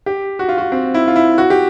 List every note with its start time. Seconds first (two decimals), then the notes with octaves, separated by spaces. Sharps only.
0.06 G4
0.39 F#4
0.49 F4
0.58 F#4
0.72 C4
0.94 E4
1.08 F4
1.16 E4
1.38 F#4
1.50 G4